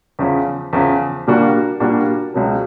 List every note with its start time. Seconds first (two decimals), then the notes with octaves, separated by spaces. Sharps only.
0.19 E2 C#3 F3
0.73 E2 C#3 F3
1.27 A#2 G3 A#3 D4 F#4
1.80 A#2 G3 A#3 D4 F#4
2.34 C#2 B2 F#3